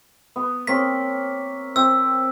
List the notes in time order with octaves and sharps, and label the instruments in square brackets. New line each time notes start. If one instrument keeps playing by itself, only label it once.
[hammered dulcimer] B3
[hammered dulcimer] A#3 C4 C#5 [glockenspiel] B6
[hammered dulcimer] C4 G5 [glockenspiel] E6